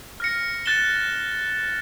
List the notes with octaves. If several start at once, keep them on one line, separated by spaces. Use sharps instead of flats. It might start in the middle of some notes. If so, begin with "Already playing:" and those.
F6 A#6 C#7
F#6 A6 C#7 E7 G7